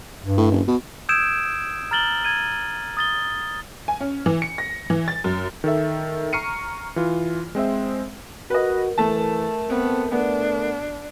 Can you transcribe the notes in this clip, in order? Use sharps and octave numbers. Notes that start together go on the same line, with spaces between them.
G2
A2
F#1
B2
D#6 E6 G6 G#6 D7 E7
A#5 F6 A6 F#7 G7
G#6 D#7
D#6 A6 G7
G#5
C#4
E3
C#7
A#6
E3
A6
F#2
D#3 A4 E5
A#5 C#6 F6 C7 C#7 D#7
E3 F4
G#3 C4 C5 E5
F#4 A#4 B4 D#5
E3 A3 A5
B3 C4
A3 B3 D4